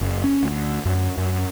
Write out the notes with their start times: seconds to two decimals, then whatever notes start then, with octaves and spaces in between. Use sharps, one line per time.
0.01 F#1
0.24 C#4
0.43 D2
0.85 F#2
1.17 F#2